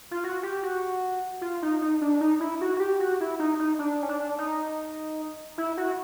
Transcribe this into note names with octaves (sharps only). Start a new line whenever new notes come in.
F4
F#4
G4
F#4
F4
D#4
D#4
D4
D#4
E4
F#4
F#4
G4
F#4
E4
D#4
D#4
D4
C#4
D4
D#4
E4
F#4